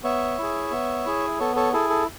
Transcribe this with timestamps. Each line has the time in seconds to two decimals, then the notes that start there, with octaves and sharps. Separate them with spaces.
0.03 B3 C#5 E5
0.38 E4 G#4
0.72 B3
1.06 E4 G#4
1.39 B3 A4 C#5
1.56 A4 C#5
1.73 E4 G#4 A4
1.90 A4